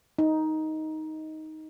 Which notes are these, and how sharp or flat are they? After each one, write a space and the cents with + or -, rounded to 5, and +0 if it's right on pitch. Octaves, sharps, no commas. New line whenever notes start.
D#4 +10